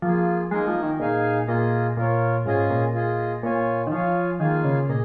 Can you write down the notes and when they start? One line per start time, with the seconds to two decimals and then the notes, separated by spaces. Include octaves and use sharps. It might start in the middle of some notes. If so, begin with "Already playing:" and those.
0.02 F3 A#3 F4 G#4
0.51 G#3 A#3 D#4 A#4 D#5 G#5
0.68 F3
0.83 D#3
1.00 A#2 D#4 G#4 F5 G#5
1.48 A#2 A#3 F4 G#4 D#5
1.97 A#2 F4 A#4 C#5
2.45 G#2 C#4 F4 G#4 D#5 G#5
2.70 A#2
2.94 F4 G#4 D#5
3.43 A#2 F4 C#5 G#5
3.87 D#3
3.91 F3 F4 C#5 F5 G#5
4.40 D#3 A#3 F4 G#4 F5 G#5
4.64 C#3
4.89 A#2 G#4 D#5